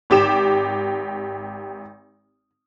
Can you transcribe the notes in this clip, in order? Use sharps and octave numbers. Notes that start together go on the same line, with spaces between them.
G#1 G4 D6 E7